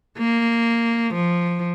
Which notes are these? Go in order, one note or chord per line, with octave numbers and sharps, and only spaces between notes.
A#3
F3